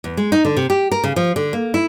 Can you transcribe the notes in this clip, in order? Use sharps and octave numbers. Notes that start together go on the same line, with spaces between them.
E2
G#3
D#4
D3
C3
G4
A#4
C#3
F3
D3
A#3
E4